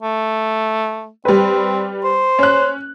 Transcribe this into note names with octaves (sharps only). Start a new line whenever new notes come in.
A3
G3 C4 B4
C5
C#4 F#6